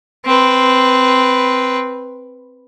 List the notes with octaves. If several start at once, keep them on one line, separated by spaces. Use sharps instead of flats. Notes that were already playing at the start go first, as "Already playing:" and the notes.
C4 B4